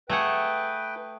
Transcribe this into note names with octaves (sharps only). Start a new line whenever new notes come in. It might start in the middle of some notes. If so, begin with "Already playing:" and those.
A3 G#4 B4 F#5 G5